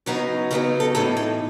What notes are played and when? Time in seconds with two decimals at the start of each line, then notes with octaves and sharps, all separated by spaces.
0.06 C#3 F#3 B3 D#4 F#4
0.51 C#3 F#3 B3 D#4 G#4
0.80 A4
0.95 A2 E3 B3 D#4 A4
1.17 A4